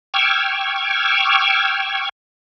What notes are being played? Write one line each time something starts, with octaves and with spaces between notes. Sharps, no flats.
G5 C#6 D6 E6 F6 G#6